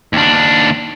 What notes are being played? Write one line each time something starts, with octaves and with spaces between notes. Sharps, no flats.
D#2 D4